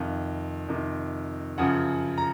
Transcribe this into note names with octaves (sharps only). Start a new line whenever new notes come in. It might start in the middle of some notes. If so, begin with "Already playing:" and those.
Already playing: F2 C3 D#3 F5
F2 C3 D#3
F#2 C#3 F3 F#5
A#5